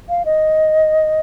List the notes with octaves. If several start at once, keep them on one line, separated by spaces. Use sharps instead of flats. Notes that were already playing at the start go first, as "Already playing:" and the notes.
F5
D#5